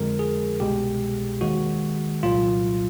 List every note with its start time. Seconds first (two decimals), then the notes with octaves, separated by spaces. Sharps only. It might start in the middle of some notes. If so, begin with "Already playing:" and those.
Already playing: F2 D3 F3 G#3 A#4
0.19 G#4
0.60 C2 B2 G#3 G4
1.41 D#2 D#3 G#3 F#4
2.23 C2 A#2 F#3 F4